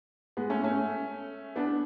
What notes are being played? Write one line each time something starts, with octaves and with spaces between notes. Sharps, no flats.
G#3 B3
A3 C#4
A3 C#4
B3 D4